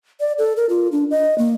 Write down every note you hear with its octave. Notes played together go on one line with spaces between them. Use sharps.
D5
A4
A#4
F4
D4
D#5
A#3